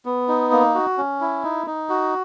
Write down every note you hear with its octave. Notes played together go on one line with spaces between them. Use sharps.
B3
D#4
A#3
F#4
C#4
E4
D#4
D#4
F#4